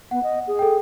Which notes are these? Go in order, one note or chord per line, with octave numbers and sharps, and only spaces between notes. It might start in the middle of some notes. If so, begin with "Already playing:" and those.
B3 F#5
D#5
G#4
A4 G5